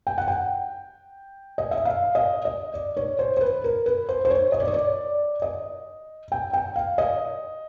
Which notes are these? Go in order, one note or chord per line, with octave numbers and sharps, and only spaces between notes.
G5
F#5
G5
D#5
E5
F5
D#5
D#5
D5
C#5
C5
C5
B4
A#4
B4
C5
C5
C#5
D#5
D5
C#5
D5
D#5
G5
G5
F5
D#5